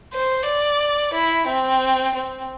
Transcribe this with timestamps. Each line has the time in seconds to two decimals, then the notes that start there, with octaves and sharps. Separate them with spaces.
0.14 C5
0.47 D5
1.14 E4
1.48 C4
2.15 C4